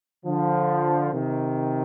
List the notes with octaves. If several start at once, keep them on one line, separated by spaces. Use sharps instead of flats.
D3 F3
C3 D#3